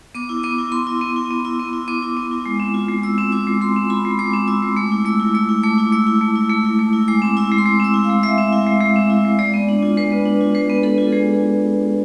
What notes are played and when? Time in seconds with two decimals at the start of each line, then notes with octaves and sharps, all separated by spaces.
0.15 B3 D6
0.29 E4
0.43 B3 D6
0.58 E4
0.72 B3 C6
0.87 E4
1.01 B3
1.16 E4
1.31 B3
1.45 E4
1.60 B3
1.73 E4
1.88 B3 D6
2.02 E4
2.17 B3
2.31 E4
2.46 G#3
2.60 C4
2.74 F4
2.89 G#3
3.03 G#3 E6
3.18 C4
3.32 F4 D6
3.47 G#3
3.61 G#3 C6
3.76 C4
3.90 F4 B5
4.05 G#3
4.19 G#3 D6
4.34 C4
4.48 F4 E6
4.62 G#3
4.76 A3 D6
4.91 E4
5.05 A3 E6
5.20 E4
5.35 A3 E6
5.49 E4
5.63 A3 D6
5.78 E4
5.92 A3 E6
6.07 E4
6.21 A3
6.36 E4
6.50 A3
6.65 E4
6.79 A3
6.93 E4
7.08 G#3 D6
7.22 C4
7.37 E4 E6
7.52 G#3
7.58 C6
7.66 G#3 D6
7.80 C4 E6
7.94 E4
8.04 F5
8.09 G#3
8.23 G#3 E5
8.38 C4
8.52 E4 E5
8.67 G#3
8.81 G#3
8.96 C4
9.10 E4
9.25 G#3
9.39 G#3 D5
9.54 B3
9.69 D4
9.83 F4
9.97 G#3 B4
10.12 B3
10.25 D4
10.41 F4
10.55 G#3 B4
10.70 B3
10.83 D4 A4
10.98 F4
11.12 G#3 G#4